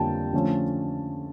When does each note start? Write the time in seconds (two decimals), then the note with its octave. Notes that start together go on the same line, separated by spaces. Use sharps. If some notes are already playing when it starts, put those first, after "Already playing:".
Already playing: F2 D3 G3 A#3 G5 A5
0.33 D3 F3 A3 C#4